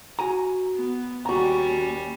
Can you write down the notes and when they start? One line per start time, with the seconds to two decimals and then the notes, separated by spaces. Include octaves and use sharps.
0.19 F#4 G#5 A#5
0.73 B3
1.26 D#2 G3 C#4 F#4 A#5